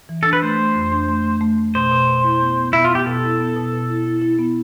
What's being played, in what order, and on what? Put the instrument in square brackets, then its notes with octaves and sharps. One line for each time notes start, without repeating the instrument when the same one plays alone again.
[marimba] E3
[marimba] D4 [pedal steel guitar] A4
[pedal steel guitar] B4
[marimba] A3 [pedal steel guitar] C5
[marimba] A3
F2
D4
A3
A3
A3
A3
[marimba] B2 [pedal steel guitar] C5
[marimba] B2
B2
E4
B3
B3
[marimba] B2 [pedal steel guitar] E4
[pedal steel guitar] F4
[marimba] B3 [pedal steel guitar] G4
[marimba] B2 [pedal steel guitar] A4
[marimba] E4
B3
B2
B2
E4
E4
E4
B3